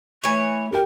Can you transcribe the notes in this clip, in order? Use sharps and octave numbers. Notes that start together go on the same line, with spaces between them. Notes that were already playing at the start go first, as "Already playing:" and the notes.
E3 A3 C#5
G4 A#4 G5